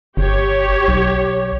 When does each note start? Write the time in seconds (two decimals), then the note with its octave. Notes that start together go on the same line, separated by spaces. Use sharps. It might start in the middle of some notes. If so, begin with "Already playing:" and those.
0.17 G1 G4 C#5
0.88 B1